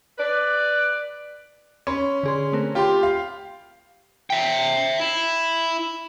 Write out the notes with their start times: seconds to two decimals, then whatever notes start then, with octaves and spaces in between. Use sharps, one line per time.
0.19 B4 D5
1.87 C#4 B5 C6
2.23 D3 G#4 C6
2.53 A3 C4 A#4
2.75 F4 G4 G5 B5 C6
3.03 F5
4.30 E5 G5
5.00 E4